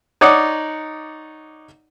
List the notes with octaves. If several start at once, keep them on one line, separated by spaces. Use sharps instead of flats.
D#4 C#5 D5 F#5 D6 D#6